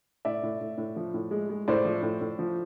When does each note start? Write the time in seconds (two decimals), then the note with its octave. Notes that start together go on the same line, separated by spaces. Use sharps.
0.25 A2 D5 E5
0.43 A2
0.61 A2
0.78 A2
0.96 F3
1.14 A2
1.31 G#3
1.50 G#3
1.68 A2 C5 D5
1.85 F3
2.02 A2
2.21 A2
2.39 F3